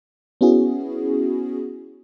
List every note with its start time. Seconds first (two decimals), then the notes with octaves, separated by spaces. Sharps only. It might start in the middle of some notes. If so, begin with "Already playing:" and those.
0.41 B3 C#4 E4 F#4 G#4